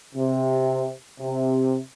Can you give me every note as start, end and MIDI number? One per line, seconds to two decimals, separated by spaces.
0.15 0.90 48
1.20 1.77 48